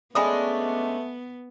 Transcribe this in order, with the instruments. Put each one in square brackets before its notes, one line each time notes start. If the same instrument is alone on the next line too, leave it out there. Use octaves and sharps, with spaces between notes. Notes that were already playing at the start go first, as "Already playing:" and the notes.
[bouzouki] G#3 C#4 D4 [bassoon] A3 [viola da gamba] B3 [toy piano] G#5 B5 D#6